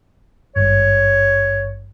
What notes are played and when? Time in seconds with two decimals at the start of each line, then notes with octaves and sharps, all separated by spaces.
0.56 G#1 G2 C#5